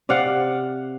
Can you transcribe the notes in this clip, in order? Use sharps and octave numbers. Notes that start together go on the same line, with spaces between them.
C3 D5 F5 F#5